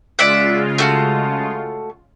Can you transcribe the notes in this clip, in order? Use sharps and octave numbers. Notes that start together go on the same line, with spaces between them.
C#3 G#3 F4 D5 E5 F#5
A3 F#4 F5